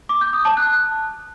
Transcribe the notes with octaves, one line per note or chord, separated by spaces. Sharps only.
D6
G6
D#6
A5
F#6